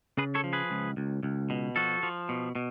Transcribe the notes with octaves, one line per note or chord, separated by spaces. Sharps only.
C#3 G#4 B4
A4 C#5
F3
G#4 B4
C#2
C#2
C#2
B2
F3 F#4 A4
F3
B2
B2